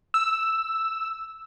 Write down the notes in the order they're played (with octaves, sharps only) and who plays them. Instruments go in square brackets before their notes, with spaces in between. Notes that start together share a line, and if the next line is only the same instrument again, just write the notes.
[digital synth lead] E6